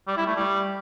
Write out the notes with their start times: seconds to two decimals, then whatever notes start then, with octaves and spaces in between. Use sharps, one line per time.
0.08 G3
0.17 E4
0.27 A3
0.36 G3